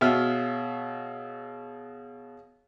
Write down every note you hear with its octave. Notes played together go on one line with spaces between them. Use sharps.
B2 G#4 C#5 E5 F5 F6